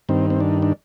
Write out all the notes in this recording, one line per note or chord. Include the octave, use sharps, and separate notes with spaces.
G2 D#3 C4
C4
D4
D4